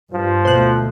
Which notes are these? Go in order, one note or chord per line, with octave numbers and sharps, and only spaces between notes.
G2 F3
D2 B2 A3 C5 F#6